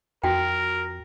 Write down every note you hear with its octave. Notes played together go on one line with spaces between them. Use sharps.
F2 F#4 A#4 G5